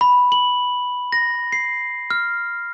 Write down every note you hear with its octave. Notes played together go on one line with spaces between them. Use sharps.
B5
F#7
A#6
C7
F6